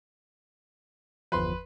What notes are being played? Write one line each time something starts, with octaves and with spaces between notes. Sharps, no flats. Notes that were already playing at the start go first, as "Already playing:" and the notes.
G1 E2 F3 B4 C6